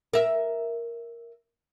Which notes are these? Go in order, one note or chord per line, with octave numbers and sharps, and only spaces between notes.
A#4 E5